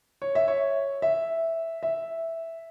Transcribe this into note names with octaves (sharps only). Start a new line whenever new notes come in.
C#5
E5
C#5
E5
E5